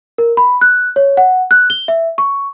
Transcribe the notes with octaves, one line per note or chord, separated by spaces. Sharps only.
A#4
B5
F#6
C#5
F#5
F#6
G7
E5
C#6